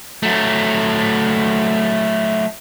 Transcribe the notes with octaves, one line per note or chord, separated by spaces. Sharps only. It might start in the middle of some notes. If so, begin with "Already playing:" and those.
F#3 A3